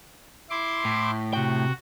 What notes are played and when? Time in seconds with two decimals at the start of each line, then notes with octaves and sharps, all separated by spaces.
0.50 E4 C6 D6
0.85 A2
1.33 C3 F#4 G5